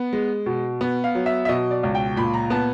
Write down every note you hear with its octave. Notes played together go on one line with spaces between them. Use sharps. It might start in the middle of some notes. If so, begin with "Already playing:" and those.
Already playing: B3
G#3
B2
B3
F5
F#3
E5
E5
B2 D#5
D5
C#2
G5
A#2 B5
A#5
B3 A5